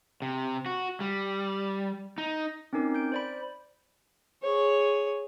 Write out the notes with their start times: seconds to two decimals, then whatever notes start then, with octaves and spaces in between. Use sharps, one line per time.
0.22 C3
0.66 F#4
1.00 G3
2.18 D#4
2.73 C4 C#4 D#4 A#4 D6
2.94 G6 D7
3.12 C5 D5 B5
4.42 G#4 C#5